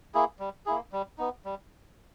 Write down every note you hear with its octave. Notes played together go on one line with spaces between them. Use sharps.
A#3 E4 G#4
G3
A#3 E4 G#4
G3
B3 D#4
G3